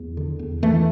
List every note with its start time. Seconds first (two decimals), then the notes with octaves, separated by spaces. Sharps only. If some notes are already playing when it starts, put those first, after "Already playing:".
Already playing: E2
0.17 D3
0.39 E2
0.62 E2 E3 A3